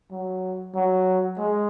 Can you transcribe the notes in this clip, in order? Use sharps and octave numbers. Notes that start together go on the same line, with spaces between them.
F#3
F#3
G#3